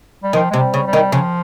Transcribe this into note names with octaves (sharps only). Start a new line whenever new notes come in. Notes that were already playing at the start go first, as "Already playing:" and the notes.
G3
D#3 F3
C3 G#3
G3
C#3
G3
D#3
C#3 F3